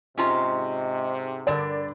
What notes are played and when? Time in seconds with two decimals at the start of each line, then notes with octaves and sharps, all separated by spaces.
0.18 G#2 C3 C#4 F4 D#5 A#5
1.47 G2 D3 A#4 D5